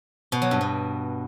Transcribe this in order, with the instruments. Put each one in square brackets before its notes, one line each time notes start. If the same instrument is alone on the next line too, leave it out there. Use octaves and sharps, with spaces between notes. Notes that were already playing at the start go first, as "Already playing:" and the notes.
[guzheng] B2
F#3
G2
B2